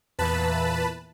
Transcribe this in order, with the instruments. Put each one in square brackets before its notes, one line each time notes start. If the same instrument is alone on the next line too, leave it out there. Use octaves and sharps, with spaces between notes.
[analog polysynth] E2 A#2 E3 [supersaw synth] B4 A5 B5